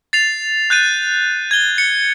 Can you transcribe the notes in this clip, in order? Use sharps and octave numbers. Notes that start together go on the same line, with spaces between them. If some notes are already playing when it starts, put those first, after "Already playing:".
A6 C7 F7
F#6 G6 A6 D#7
G#6 G7
C#7